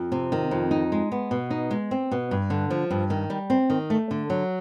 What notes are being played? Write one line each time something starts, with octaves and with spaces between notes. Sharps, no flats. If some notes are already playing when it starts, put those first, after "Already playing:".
Already playing: F2
C3
D#3
F2
D#4
G#3
B3
B2
D#4
G#3
C4
B2
G2
D3
F3
G2
D#3
G3
C4
D#3
A3
D3
F#3